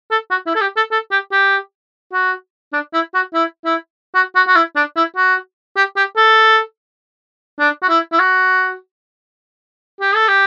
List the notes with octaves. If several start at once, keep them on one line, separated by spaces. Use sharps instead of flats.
A4
F#4
E4
A4
G4
A4
A4
G4
G4
F#4
D4
E4
F#4
E4
E4
F#4
F#4
F#4
E4
D4
E4
F#4
G4
G4
A4
D4
F#4
E4
E4
F#4
G4
A4
G4